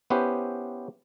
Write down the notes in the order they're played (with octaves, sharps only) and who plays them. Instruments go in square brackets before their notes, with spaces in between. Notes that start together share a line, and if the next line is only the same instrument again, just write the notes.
[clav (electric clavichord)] B3 C#4 E4 G4 B4 C5